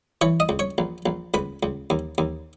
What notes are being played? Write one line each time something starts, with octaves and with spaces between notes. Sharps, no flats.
E3 C#5
D#5
C#2
C#5
A#1
A#1
C#2 B4
C#2
D#2
D#2